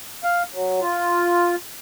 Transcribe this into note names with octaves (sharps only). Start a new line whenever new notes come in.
F5
F#3
F4